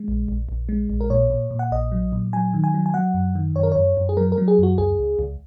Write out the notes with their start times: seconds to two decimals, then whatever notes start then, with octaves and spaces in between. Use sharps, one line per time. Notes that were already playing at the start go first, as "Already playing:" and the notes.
Already playing: G#3
0.08 A#1
0.28 A#1
0.49 A#1
0.69 G#3
0.90 A#1
1.01 A#4
1.10 A#2 C#5
1.30 A#2
1.51 A#2
1.59 F#5
1.71 A#1 D#5
1.92 F#3
2.12 A#2
2.33 F#3 G#5
2.54 D#3
2.64 G#5
2.74 F#3
2.86 G#5
2.94 F#3 F#5
3.14 F#2
3.35 D#3
3.55 F#2 C#5
3.63 A#4
3.72 F#2 C#5
3.97 F#2
4.09 G#4
4.17 F#3 A#4
4.32 A#4
4.38 F#3
4.48 G#4
4.59 F#2 F#4
4.78 C#2 G#4
4.99 C#2
5.19 C#2